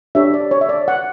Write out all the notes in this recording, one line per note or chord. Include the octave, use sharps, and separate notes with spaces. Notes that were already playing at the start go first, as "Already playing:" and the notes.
D4 G4 C#5 E5
D5
C#5
E5
D5
F#5